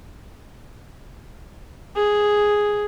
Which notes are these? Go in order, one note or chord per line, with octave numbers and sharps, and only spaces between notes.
G#4